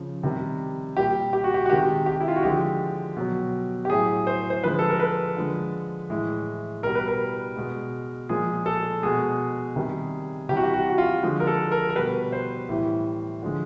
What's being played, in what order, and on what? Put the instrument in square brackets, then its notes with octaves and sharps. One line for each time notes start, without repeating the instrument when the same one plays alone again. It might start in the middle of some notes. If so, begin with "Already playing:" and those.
Already playing: [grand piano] C#3 F3
C3 D#3 G3
A#2 G3 G4
G4
F#4
G4
F#4
C3 D#3 G#3 G4
G4
E4
F4
F#4
D3 F3 G#3 G4
B2 F#3
G4
A2 F#3 G#4
C5
C5
D3 F3 G#3 B4
A4
A#4
B4
D3 F3 G#3
A2 E3 G#3
B2 G3 A#4
B4
A#4
B2 G#3
A#2 F3 G#3 G#4
A4
B2 G#3 G#4
C3 D#3 G3
C3 E3 G3 G4
F#4
G4
F#4
F#4
F4
D3 F3 G#3
A#4
A4
A#4
A#4
B2 G3 B4
C5
A2 E3 G3
D3 F3 G#3